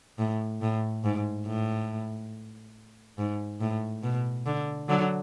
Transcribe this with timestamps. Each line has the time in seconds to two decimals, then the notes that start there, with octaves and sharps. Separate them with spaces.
0.18 A2
0.62 A2
1.04 G#2
1.46 A2
3.18 G#2
3.61 A2
4.03 B2
4.46 D3
4.89 D3 F#3